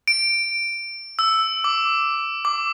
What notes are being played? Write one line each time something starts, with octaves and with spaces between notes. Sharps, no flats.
D7
E6
D6
D6